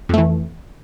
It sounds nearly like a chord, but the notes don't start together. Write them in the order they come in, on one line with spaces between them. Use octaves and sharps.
F2 A3 E3